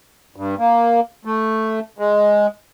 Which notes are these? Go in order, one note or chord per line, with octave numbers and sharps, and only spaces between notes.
G2
A#3
A3
G#3